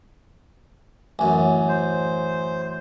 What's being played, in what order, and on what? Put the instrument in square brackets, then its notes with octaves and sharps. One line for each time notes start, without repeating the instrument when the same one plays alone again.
[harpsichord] A1 F#2 [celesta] G#5
[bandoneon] C5